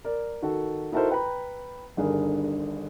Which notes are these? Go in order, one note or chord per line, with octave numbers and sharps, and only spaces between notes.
A#4 D5
D#3 F#4 A4
D#4 E4 F#4 A4 A#4 C5
B4 G5 A#5 B5
G1 G2 D3 D#3 G#4 A#4